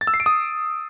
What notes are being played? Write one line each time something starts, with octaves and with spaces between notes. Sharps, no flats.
A6
E6
C7
D7
D#6